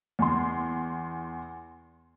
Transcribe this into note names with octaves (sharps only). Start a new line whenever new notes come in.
E2 C6